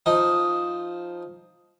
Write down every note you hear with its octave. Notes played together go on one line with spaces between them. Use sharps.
F3 D#4 D#5